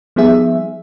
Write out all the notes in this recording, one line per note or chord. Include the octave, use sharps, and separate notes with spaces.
F3 G3 B3 D#4 G#4 E5